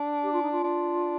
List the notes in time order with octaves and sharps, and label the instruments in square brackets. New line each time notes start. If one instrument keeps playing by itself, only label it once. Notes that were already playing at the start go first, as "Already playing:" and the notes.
Already playing: [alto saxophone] D4
[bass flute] G4
F4
D#4
F4
[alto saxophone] D4